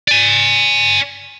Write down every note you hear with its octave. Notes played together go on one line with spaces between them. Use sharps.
D5 G#5